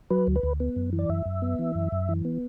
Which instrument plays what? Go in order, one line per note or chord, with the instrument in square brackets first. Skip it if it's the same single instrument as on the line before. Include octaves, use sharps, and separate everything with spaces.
[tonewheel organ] F#3 B4
D2
B4
D2
B3
F#2
E3
D5
F#2 E5
F#2
B3
E3
F#2
F#2
E3
B3